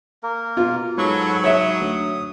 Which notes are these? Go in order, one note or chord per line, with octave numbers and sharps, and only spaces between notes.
A#3 A#4
B2 F4
G#2 F#3 A4 B4 C#5
C#5 E5 D#6
D2